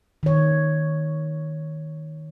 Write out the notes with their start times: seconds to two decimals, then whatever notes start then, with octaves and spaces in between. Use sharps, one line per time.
0.23 D#3 C#5